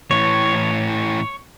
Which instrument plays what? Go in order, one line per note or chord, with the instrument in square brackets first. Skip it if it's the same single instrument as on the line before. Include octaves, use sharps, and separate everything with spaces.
[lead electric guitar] A2 E3 [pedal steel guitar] C#5